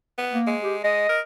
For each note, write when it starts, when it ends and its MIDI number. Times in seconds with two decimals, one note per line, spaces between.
0.18 0.38 59
0.33 0.55 58
0.47 0.81 56
0.63 0.76 67
0.84 1.07 56
0.84 1.19 75
1.09 1.21 70